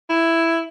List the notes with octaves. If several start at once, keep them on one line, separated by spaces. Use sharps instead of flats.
E4